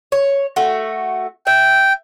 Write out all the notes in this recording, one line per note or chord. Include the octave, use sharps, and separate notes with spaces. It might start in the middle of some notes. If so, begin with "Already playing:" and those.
C#5
A3 F#4
E5 G5